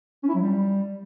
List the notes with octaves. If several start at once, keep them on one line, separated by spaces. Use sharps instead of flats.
C#4
E4
F#3
G3